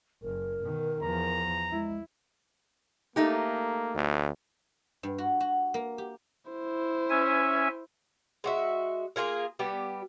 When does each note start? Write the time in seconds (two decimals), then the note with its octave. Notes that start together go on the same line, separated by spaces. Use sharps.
0.23 F#1 A#4
0.64 B2 D#3
1.02 E2 F3 A#5
1.72 G#3 E4
3.16 A3 A#3 D#4 G4
3.95 D2
5.03 G2
5.18 F#4
5.40 F#4
5.74 A#3
5.98 G4
6.51 E4 C5
7.10 C#4 E5 G#5
8.44 G#3 F#4 E5
9.16 A#3 F4 G#4 A#4
9.59 G3 B3 G4